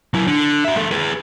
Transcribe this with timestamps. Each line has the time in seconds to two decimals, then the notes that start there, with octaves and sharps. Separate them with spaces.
0.14 F#3 E4
0.27 D3
0.65 F#4 E5
0.76 G#3 A4
0.91 G#4 B4